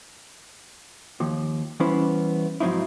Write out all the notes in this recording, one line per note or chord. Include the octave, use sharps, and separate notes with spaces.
D#2 F3
E3 G3 B3 C#4 E4 C5
G#2 F3 F#3 C4 D#4 E4